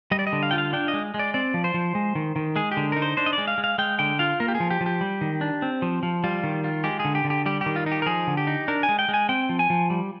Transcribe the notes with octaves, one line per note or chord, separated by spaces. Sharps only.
G3 D#5
D5
D#5
D3
F5
F4 G5
F5
D4 G5
D#5
G#3
G#3
D5
C4 D5
F3
C5
F3
G#3
D#3
D#3
G#3 G#4
G4
D3
D#4 A#4
C5
D4 C5
D#5
D5
G#3
F5
G#3
F5
G#3 G5
D3 G5
F4 F5
A#3 A#4
G4
G#4
F3
G4
F3
G4
G3
D#3
D4
C4
F3
F3
G3 F4
D#3
F4
G#3 G4
G#4
D3
G4
D3
G4
G3 G4
G4
D#3
F4
D#4
G4
A#4
F3 G#4
D3
G4
D#4
D4 A#4
G#5
G#3
G5
G#3
G#5
C4 G5
F3
G#5
F3
G3